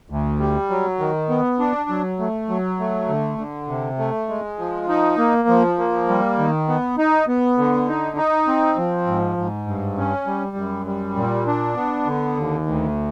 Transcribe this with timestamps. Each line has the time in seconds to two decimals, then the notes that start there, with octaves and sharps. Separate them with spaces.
0.10 D2
0.39 G3
0.70 F#3
0.99 D#3
1.29 B3
1.59 D4
1.90 F#3
2.19 A3
2.49 F#3
2.80 A3
3.08 D3
3.38 D3
3.68 C3
3.99 A3
4.29 G#3
4.59 F3
4.89 D#4
5.18 A#3
5.48 F3
5.78 A#3
6.08 G3
6.39 D#3
6.68 B3
6.98 D#4
7.27 B3
7.58 D3
7.88 D#4
8.17 D#4
8.47 C4
8.77 F3
9.07 G#2
9.37 G#2
9.67 G2
9.97 C#4
10.26 G3
10.56 F#2
10.86 G3
11.16 A#2
11.47 D4
11.76 B3
12.06 D3
12.37 D#2
12.66 D2